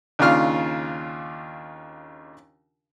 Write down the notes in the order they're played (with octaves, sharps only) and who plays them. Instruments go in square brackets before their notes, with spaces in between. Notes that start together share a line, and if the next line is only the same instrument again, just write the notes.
[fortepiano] D#2 C#3 D4 F4 F6